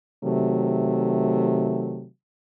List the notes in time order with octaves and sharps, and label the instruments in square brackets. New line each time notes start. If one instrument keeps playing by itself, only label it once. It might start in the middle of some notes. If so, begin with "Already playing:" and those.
[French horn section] C3 D#3 F#3 A3